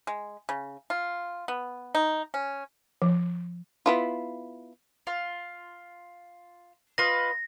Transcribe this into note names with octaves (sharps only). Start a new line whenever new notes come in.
G#3
C#3
F4
B3
D#4
C#4
F3
B3 E4 F4
F4
F4 B4 D#5 A#6